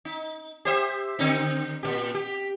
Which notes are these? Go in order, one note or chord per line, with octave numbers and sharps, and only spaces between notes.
D#4
G4 C5 E5
D3 C4 D#4
A#2 C#3 G4
G4